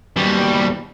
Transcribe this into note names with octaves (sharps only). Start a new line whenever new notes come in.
D#2 B2 G3